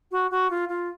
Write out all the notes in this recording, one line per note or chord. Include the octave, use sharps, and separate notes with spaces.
F#4
F#4
F4
F4